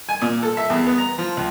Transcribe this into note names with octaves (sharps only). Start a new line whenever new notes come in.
G#5
A#2
A4
E5
E2
B3
A#5
F3
C#2